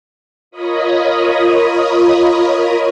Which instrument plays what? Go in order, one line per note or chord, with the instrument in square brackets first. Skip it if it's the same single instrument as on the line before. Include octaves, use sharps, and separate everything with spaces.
[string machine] F4 A#4 C#5 D#5 B5 D#6